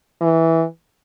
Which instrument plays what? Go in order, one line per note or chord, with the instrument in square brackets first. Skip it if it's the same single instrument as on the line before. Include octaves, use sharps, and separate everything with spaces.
[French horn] E3